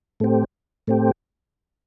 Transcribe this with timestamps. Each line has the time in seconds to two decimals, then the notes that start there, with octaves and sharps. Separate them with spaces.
0.20 A2 A3 C4 G4
0.87 A2 A3 C4 G4